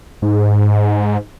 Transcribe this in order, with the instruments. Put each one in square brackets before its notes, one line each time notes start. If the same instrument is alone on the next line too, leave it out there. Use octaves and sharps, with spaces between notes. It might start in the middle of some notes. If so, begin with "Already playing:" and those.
[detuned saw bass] G#2